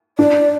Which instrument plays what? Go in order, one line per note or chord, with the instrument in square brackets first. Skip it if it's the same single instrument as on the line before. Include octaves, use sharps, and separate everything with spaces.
[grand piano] D4 [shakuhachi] D5